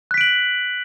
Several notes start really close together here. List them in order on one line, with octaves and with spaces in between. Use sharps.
F#6 B6 D7 F#7